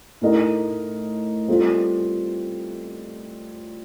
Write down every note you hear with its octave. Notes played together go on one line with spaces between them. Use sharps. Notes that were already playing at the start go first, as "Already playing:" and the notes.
A2 A3 D#4 A#4 D#5
G3 C4 F4 A4 C5